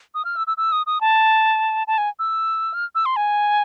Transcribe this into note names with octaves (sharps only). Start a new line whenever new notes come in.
D#6
F6
E6
E6
E6
D#6
D#6
A5
A5
G#5
E6
F6
E6
C6
G#5